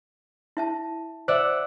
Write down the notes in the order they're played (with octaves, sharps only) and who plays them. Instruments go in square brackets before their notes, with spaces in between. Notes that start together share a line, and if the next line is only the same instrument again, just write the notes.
[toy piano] E4 E5 A5
[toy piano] C5 [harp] D5 E5 F#5